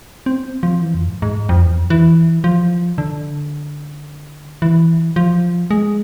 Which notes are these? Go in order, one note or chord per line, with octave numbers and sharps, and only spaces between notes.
C4
F3
E3
F2
G#2
G#2
F2
E2
F2
E3
F3
D3
E3
F3
G#3